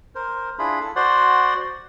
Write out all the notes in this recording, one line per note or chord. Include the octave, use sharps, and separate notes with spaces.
A#4 C5
D4 E4 F4 G#4 B5
A4
F#4 C5 D5 F#5 C6